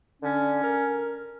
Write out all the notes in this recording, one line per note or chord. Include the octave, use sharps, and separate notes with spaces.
D3 C#4
A#4